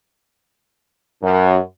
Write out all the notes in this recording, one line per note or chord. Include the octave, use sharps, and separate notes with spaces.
F#2